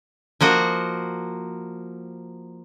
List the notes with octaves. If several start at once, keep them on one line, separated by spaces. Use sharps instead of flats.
F3 A#3 F#4 D#5